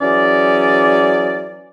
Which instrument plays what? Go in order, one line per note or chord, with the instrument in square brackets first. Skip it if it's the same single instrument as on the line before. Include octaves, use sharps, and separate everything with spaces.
[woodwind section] E3 F#3 C#4 G#4 D5